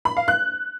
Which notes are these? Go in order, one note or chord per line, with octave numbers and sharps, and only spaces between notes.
B5
F5
F#6